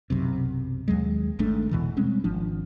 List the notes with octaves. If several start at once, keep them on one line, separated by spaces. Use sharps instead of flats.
B1 F#2 C3
D#2 F#3 G#3
G#1 G#2 A3 D4
E2 B2 E3
G3 G#3 C4 C#4
G#1 F3 D4